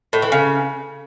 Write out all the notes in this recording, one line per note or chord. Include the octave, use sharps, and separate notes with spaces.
A2
E3
C#3